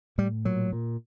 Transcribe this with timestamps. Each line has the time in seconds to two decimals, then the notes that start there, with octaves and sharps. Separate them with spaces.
0.18 A2 G3
0.45 A#2 F#3
0.73 A#2